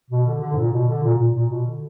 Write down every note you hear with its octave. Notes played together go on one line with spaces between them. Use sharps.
B2
D3
D3
G#2
A#2
B2
D3
A#2
A#2
A#2
B2
D3